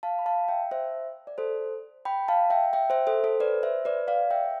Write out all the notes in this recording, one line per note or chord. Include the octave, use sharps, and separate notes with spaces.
F5 A5
B5
F5 A5
E5 G5
C5 E5
D5
A4 C5
G5 B5
F5 A5
E5 G5
E5 G5
C5 E5
A4 C5
A4 C5
B4 D5
C5 E5
B4 D5
D5 F5
E5 G5